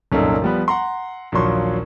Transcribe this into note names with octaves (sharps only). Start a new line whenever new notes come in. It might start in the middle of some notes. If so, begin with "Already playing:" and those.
C2 F#2 A#2 D#4 A4
F3 G3 B3
F#5 A#5 C6
A#1 D#2 F3 F#3 C6 C#6